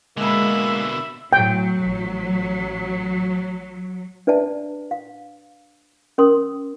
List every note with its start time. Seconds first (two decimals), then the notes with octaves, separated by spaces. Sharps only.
0.17 B2 D3 G#3 A#3 E5 B5
1.33 A2 F#3 G5
1.82 A1
4.27 D4 B4 D5 E5 A5
4.91 F5
6.18 C#4 A#4 C6 D#6